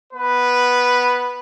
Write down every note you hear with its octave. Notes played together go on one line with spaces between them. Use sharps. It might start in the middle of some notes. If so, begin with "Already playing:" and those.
B3 B4